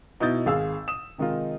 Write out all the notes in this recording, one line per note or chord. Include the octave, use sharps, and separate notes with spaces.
B2 D#4 E4 D#6 G6 A6
G#1 G#4 F5 E6
D#6 E7
C3 D#3 G#3 D#4 F4